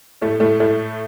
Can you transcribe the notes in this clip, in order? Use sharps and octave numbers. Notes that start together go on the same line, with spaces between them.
A2 A3
A2 A3
A2 A3